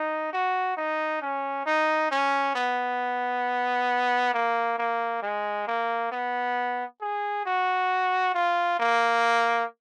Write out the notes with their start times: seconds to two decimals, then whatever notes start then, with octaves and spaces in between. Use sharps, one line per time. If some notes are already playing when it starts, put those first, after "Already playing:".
Already playing: D#4
0.33 F#4
0.77 D#4
1.22 C#4
1.66 D#4
2.11 C#4
2.55 B3
4.34 A#3
4.78 A#3
5.23 G#3
5.67 A#3
6.12 B3
7.01 G#4
7.46 F#4
8.35 F4
8.80 A#3